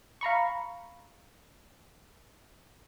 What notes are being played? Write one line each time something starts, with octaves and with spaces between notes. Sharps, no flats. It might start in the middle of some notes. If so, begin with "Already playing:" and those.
F5 A#5 B5 C#6